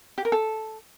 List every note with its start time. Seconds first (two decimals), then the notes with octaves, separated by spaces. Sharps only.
0.18 G4
0.25 A#4
0.32 A4